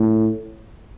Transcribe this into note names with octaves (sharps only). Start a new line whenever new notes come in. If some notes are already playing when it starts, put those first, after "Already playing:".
Already playing: A2